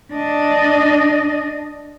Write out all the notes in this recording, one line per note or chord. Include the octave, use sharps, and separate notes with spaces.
D4 D#5